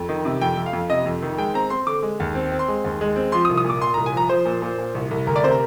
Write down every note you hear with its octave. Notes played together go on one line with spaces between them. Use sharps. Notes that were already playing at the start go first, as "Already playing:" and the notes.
Already playing: F2
D#3
C3
F2 G5
F2
F5
F2
C3 D#5
F2
D#3
G#3 G5
C4 A#5
C4 C6
D3 D6
G#3
D#2
C4
C4
C6
G#3
D#2
G#3
C4
F3 C6
D#6
C2
D#6
A#2 D6
A#2 C6
C2 A#5
G#5
F3 A#5
F3 C5
A#2
A#2
A#2
C2
C2
D2 A#4
D5
C3 C5
A#4